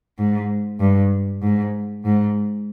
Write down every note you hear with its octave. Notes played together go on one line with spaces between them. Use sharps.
G#2
G2
G#2
G#2